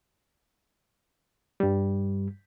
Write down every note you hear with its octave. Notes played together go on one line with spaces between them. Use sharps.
G2 G3